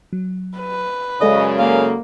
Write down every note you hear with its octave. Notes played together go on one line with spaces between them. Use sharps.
F#3
B4
F#2 C#3 G#3 A4 D5 D#5
A#3 F5